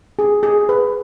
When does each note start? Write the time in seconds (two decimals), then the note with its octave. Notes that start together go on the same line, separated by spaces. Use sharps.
0.19 G#4
0.43 G#4
0.69 B4